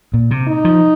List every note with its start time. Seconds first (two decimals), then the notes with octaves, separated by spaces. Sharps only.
0.14 A#2
0.31 C3
0.48 D#4
0.65 F3